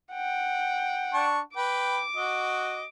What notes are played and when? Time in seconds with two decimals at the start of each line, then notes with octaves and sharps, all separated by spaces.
0.12 F#5 G5
1.14 D4 A5 C#6
1.56 B4 G5 D6
2.16 F#4 D#5